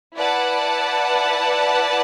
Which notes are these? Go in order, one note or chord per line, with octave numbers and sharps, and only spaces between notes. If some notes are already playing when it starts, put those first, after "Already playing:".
E4 B4 D5 F#5 A5